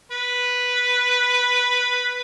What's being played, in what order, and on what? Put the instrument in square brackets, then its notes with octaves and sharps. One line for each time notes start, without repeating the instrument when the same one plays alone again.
[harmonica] B4